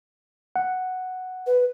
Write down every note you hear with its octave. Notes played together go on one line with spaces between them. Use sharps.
F#5
B4